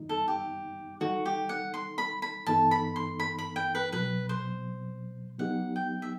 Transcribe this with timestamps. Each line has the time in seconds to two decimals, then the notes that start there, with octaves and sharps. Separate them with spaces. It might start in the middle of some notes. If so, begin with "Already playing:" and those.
Already playing: F#2 D#3 G3 D#4
0.09 A4
0.28 G4
1.01 D#3 G3 D#4 F#4 A4
1.26 G4
1.49 F#5
1.74 C6
1.98 B5
2.22 B5
2.47 G2 E3 B3 D#4 A4 A5
2.71 B5
2.96 C6
3.20 B5
3.38 B5
3.56 G5
3.75 B4
3.92 C2 B2 F#3 B4
4.29 C5
5.39 F#3 B3 D#4 G4 F#5
5.76 G5
6.02 E5